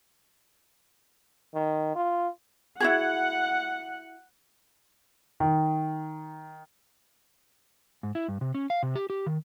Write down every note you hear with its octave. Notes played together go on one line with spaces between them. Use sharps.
D#3
F4
E4 F#4 G#4 F#5
D#3
G#2
E4
G2
C3
C#4
F5
C3
G4
G4
D#3